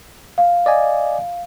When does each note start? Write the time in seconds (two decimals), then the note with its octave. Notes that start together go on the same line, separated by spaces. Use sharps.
0.38 F5
0.66 D5 D#5 G#5